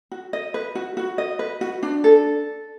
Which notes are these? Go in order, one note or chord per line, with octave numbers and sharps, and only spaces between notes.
F#4
D#5
B4
F#4
F#4
D#5
B4
F#4
D4
A4